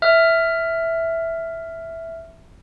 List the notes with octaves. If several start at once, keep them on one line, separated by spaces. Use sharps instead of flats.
E5 F6